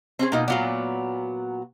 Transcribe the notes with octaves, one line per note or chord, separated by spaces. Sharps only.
C4 C#4 G#4
B2 A#3 D#4 F4
A#2 F#3 B3 F4 D5